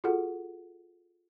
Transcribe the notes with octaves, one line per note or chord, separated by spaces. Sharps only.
F4 F#4 G#4 A4 F#5